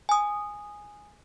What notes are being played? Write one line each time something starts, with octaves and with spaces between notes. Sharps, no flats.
G#5 D#6